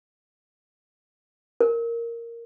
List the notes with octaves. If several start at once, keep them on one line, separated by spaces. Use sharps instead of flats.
A#4